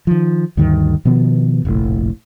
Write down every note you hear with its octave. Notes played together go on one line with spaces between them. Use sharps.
D#3 F3
D2 G2 D#3
B2 D#3 F3 B3
F1 A#1 A2